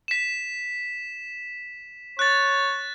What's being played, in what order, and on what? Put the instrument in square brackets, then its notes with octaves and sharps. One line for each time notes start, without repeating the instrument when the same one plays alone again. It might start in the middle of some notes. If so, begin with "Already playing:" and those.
[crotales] B6 E7
[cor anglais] C#5 [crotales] F#6 A6